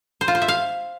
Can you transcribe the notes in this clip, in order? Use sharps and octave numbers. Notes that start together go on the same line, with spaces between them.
C5
F4
C5
E5
F5